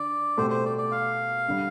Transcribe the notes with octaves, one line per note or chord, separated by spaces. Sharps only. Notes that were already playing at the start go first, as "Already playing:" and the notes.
Already playing: D3 D5
B2 A3 C4 G4 C5
C5
D5
D5
F5
D3 G3